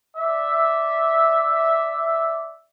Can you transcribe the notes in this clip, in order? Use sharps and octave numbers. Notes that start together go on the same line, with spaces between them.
D5 E5